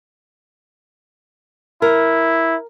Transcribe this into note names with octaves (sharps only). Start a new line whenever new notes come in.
E4 A#4